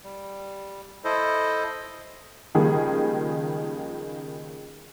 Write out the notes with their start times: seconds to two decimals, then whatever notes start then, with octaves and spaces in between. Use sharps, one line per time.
0.04 G3
1.04 E4 A4 C5 D#5
2.55 C#2 D#3 F3 G3 A#3 G#4